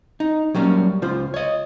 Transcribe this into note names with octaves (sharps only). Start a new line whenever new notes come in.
D#4
F#3 G3 A#3 C#4
C#2 F4 C5
C#5 D#5